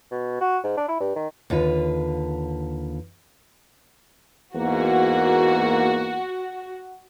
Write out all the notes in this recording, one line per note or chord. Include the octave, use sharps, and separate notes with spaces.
B2
F#4
G#2
D4
E4
G2
D#3
D#2 D3 F4 B4
E2 G#2 A#3 F#4